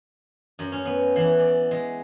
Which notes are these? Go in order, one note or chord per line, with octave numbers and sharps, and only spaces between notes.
F#2
C#4
B3
E3
D5
G#3